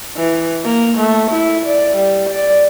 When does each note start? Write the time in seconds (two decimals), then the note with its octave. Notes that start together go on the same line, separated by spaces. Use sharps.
0.17 E3
0.65 A#3
0.98 A3
1.31 E4
1.66 D5
1.96 G3
2.30 D5